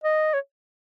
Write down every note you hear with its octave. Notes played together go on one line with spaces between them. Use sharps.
D#5
C#5